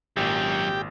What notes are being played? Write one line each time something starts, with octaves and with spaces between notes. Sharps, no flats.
G#1 F#2 A#2 F#3 G4